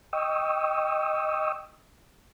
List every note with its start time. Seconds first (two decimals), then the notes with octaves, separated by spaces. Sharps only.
0.13 D#5 G5 C#6 D#6 E6